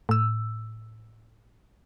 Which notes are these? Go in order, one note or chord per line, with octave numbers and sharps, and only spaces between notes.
A2 E6